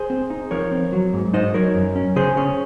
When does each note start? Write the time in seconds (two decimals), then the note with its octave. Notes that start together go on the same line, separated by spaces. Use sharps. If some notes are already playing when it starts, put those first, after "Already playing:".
Already playing: G#4 C5
0.10 C4
0.30 D#4
0.51 F3 A#4 C#5
0.72 C4
0.92 F#3
1.13 G#2
1.33 D#4 C5 D#5
1.54 F#3 A#4 C#5
1.75 F#2
1.96 C#4
2.16 C#3 G#4 C5
2.37 C#4